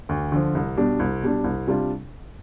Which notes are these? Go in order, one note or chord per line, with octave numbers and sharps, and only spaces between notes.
D2
D3 F3
C2
B2 G3 D4
C2
B2 G3 D4
C2
C3 G3 D4 F4